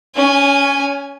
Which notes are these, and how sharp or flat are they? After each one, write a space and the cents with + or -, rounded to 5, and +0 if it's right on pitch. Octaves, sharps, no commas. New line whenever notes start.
C#4 +15 G#5 -15